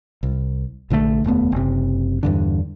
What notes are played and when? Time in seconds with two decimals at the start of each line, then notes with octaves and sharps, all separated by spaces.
0.23 C2
0.90 A#1 D3 D#3 A3
1.24 F1 D#2 A3 B3
1.52 F#1 C3
2.23 E2 G2 D3